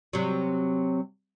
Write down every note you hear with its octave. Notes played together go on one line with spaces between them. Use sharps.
C3 F#3